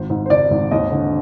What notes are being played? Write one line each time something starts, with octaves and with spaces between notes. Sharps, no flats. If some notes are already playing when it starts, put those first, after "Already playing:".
Already playing: G#1 C5
G#2
C5
G#1 D5
G#1
D#2 D#5
D3